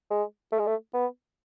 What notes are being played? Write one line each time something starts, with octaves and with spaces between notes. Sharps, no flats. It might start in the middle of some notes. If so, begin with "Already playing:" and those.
G#3
A3
G#3
A3
B3